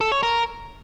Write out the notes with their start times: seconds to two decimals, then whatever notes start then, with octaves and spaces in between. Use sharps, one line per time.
0.01 A4
0.12 C#5
0.23 A#4